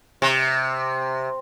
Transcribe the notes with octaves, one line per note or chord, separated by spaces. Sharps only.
C3